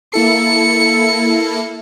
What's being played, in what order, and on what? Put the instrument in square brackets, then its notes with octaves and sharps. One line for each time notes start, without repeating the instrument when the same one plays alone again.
[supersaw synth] A#3 E4 A4 [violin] C#7